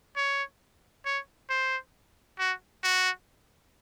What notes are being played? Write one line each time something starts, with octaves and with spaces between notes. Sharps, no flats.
C#5
C#5
C5
F#4
F#4